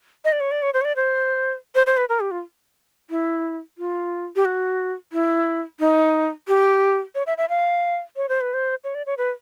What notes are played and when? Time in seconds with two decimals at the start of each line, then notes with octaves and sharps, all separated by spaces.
0.25 D#5
0.32 D5
0.40 C#5
0.51 D5
0.62 C#5
0.74 C5
0.81 C#5
0.85 D5
0.96 C5
1.75 C5
1.86 C5
1.97 B4
2.09 A#4
2.20 G4
2.31 F4
3.10 E4
3.78 F4
4.36 G4
4.45 F#4
5.13 E4
5.80 D#4
6.48 G4
7.15 C#5
7.27 E5
7.38 E5
7.49 F5
8.16 C#5
8.29 C5
8.41 B4
8.54 C5
8.84 C#5
8.95 D5
9.06 C#5
9.18 B4